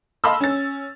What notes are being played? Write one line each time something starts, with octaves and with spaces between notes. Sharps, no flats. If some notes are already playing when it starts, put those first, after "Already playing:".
D#5 F5 A5 B5 C6 E6
C#4 A6